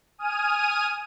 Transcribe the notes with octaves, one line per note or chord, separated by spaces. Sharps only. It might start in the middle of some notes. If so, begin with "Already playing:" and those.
G#5 D#6 F6 D#7